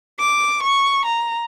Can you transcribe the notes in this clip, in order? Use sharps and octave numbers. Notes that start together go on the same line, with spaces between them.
D6
C#6
A#5